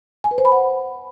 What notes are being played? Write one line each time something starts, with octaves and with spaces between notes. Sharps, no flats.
G#5
B4
C5
B5
F#5